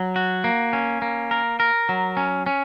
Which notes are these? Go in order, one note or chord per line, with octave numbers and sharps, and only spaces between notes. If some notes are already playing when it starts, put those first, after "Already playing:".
Already playing: F#3
F#4
A#3
C#4
A#3
A#4
A#4
F#3
C#4
C#4